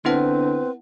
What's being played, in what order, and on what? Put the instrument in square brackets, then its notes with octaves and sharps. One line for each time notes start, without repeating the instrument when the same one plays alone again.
[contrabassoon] D3 [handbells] B3 E4 F#5 [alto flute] C4 [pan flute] B4